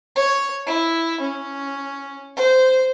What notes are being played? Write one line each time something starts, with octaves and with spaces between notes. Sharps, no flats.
C#5
E4
C#4
C5